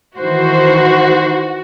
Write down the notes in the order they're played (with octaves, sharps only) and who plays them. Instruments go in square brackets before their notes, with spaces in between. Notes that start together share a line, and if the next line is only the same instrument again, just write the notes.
[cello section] D#3 E3 C5 [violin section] F#4